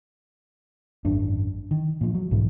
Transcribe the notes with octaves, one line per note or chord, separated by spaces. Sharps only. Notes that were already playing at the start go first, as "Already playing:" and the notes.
G#1 F#2 D4
D#3
A#2 F3
F#3
B1 G#2 B2 E3